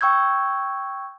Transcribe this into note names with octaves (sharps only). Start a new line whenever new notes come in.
G5 C#6 E6 G6 G#6